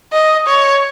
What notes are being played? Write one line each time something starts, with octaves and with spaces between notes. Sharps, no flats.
D#5
C#5